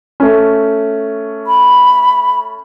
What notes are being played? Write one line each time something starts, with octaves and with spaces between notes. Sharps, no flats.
A3 C#4
B5